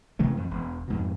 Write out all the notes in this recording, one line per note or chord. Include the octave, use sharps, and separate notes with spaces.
C3 E3 G#3 A3
F2
E1
F2 G#2 B2